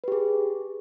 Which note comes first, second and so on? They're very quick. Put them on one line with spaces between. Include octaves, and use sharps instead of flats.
B4 G4 G#4